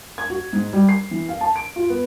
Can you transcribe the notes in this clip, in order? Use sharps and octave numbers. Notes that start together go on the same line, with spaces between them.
G#6
F#4
G#2
G3
C7
E3
F5
A5
D7
F4
B3